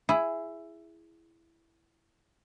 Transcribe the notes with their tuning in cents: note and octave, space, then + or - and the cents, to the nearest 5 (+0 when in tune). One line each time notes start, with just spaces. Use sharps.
E4 +10 G#4 +0